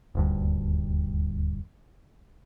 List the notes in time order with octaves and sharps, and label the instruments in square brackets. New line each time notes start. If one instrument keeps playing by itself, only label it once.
[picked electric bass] D#1 D2 G2